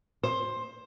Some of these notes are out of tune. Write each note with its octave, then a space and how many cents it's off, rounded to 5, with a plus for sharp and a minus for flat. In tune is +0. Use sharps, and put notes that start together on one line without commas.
C5 +15